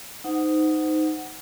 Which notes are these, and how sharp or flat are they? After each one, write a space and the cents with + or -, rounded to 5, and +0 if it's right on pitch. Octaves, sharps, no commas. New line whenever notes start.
D#4 +0 C5 -25 F#5 +0